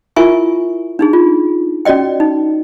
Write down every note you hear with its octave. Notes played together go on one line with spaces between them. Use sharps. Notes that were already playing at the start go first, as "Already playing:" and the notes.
E4 F4 A#4 E5 G#5 C#6
D4 D#4 G#4
F4
C#4 F#4 D5 D#5 G5
D#4